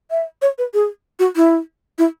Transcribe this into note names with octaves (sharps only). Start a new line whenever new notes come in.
E5
C#5
B4
G#4
F#4
E4
E4